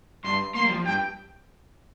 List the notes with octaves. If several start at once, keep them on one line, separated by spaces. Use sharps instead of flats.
G2 C6
A#3 C6
G3
F3
G2 G5